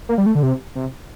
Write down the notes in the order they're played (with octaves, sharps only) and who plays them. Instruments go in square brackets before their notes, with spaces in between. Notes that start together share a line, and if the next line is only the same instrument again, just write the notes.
[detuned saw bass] A#3
G3
A3
D3
C3
C3